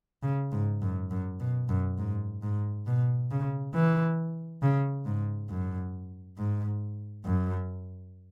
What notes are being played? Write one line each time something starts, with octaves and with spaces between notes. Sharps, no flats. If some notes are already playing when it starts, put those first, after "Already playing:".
C#3
G#2
F#2
F#2
B2
F#2
G#2
G#2
B2
C#3
E3
C#3
G#2
F#2
G#2
F#2